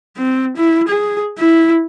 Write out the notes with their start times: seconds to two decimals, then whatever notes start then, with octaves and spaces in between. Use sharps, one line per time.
0.18 C4
0.57 E4
0.88 G#4
1.39 E4